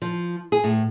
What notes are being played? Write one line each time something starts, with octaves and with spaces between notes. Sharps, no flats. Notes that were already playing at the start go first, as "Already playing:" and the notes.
F3
G#4
A2